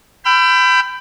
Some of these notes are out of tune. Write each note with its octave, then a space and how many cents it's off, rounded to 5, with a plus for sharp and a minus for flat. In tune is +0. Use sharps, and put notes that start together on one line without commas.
G5 +0 B5 +25 E6 +45